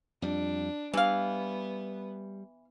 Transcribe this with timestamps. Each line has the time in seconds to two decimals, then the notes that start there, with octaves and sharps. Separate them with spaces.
0.22 F2 G3 D4
0.94 E3 G3 B3 F5